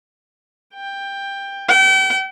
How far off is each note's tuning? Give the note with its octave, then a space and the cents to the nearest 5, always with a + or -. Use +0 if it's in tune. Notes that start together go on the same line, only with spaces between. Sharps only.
G5 +15
G5 -40